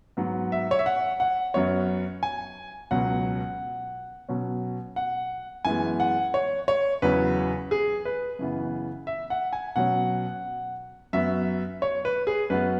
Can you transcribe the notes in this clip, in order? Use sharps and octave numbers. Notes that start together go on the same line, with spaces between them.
G#2 F#3 B3
E5
C#5
E5
F#5
F#5
F#2 F#3 B3 C#5
G#5
C#2 B2 F#3 C#4 F#5
B2 F#3 C#4
F#5
F#2 E3 G#3 B3 G#5
F#5
C#5
C#5
E2 C#3 F#3 C#4 B4
G#4
B4
F#2 C#3 E3 B3
E5
F#5
G#5
B2 F#3 C#4 F#5
F#2 F#3 B3 E5
C#5
B4
G#4
F#2 F#3 B3 B4